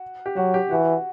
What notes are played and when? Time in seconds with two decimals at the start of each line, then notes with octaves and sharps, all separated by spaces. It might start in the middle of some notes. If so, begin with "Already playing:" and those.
Already playing: F#4
0.26 G4
0.36 F#3 F#4
0.54 G4
0.71 E3 F#4